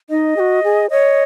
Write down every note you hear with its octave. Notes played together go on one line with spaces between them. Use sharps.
D#4 D#5
G#4
F#4
G#4
C#5 D#5